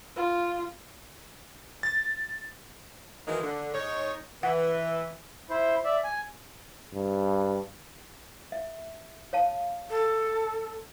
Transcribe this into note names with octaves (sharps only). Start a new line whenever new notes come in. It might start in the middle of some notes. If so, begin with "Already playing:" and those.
F4
A6
D#3 E3 F#3 G#3 A#3 D#4
D3
G#2 D#4 C#5
E3 F#5
E4 C5
D5 E5
G#5
G2
E5
C#5 F5 A5
A4